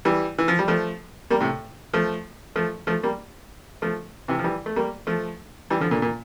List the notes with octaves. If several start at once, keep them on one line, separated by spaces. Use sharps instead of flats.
E3 G3
E3
F3
G3
F3 A3
G3 A#3
A2 C3
F3 A3
F3 A3
F3 A3
G3 A#3
F3 A3
C3 E3
F3
E3 G3
A3
G3 A#3
F3 A3
E3 G3
D3 F3
A#2 D3
A#2